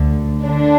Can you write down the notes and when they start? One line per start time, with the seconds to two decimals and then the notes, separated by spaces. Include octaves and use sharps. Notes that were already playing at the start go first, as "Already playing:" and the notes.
Already playing: D2 D3
0.45 D3 D4